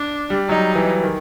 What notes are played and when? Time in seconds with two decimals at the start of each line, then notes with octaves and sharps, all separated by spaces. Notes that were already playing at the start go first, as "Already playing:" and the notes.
Already playing: D4
0.30 G3
0.49 F#3 D#4
0.75 E3
1.03 D#3